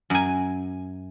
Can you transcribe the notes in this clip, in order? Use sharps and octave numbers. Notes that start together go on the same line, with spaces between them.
F#2 G#5